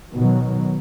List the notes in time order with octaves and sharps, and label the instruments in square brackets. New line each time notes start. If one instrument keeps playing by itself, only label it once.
[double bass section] B2 D#3 F#3